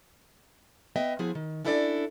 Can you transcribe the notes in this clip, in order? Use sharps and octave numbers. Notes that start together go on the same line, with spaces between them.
B3 D#5 E5 G5
F3 B3 E4 G#4
D#3
C#4 D4 E4 A4 C#5 D5